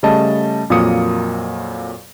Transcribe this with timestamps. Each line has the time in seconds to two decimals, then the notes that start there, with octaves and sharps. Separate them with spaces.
0.03 C#3 G3 A3 D#5 A5
0.70 F2 A#2 F#3 A#3 D#6 C#7